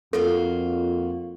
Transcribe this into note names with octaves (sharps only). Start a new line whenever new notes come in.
F2 A#3 F4 F#4 A4